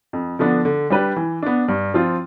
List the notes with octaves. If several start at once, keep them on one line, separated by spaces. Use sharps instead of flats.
F2
D3 F3 B3 D4
D3
G3 D4 G4 B4
E3
B3 D4
G2
F3 C4 F4